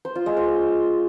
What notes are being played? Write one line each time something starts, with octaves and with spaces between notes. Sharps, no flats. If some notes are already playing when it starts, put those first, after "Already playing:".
C5
F4
G#3
C5